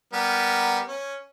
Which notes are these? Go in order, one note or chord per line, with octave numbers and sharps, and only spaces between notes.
G3 B3 A#4
C#4